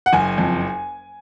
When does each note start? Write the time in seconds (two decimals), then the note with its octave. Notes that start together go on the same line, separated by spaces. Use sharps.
0.06 F#5
0.13 F#1 G#5
0.38 F2